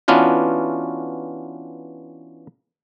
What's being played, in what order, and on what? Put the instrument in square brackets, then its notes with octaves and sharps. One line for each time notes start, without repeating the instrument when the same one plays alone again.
[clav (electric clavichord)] E3 B3 C#4 D4 F4 F#4